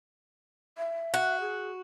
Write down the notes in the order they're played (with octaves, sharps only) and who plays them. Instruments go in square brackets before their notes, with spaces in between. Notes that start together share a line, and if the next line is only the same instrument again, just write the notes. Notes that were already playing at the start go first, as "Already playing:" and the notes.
[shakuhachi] E5
[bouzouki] F#4
[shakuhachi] G#4